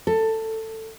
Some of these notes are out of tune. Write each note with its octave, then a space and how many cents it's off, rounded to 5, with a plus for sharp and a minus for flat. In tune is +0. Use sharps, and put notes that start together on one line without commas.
A4 +15